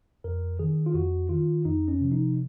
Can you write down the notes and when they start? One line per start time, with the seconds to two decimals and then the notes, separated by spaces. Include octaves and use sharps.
0.24 F2 A#4
0.59 D#3 G#4
0.86 F4
0.95 F2 F#4
1.29 D#3 F4
1.65 F2 D#4
1.88 C#4
2.01 C3 F3
2.12 D#4